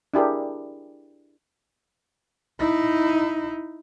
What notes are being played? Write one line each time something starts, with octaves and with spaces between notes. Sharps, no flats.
D4 E4 G4 G#4 A#4
D#4 E4